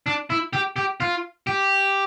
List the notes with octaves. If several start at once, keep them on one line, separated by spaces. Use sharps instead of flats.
D4
E4
G4
G4
F4
G4